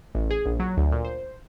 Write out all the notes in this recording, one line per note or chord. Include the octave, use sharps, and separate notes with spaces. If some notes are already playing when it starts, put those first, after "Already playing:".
A1
G#4
A#1
F#3
D2
A#2
C5